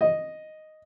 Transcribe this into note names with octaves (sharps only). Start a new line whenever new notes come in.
D#5